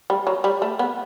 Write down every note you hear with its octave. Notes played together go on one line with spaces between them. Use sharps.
G3
F#3
G3
A3
B3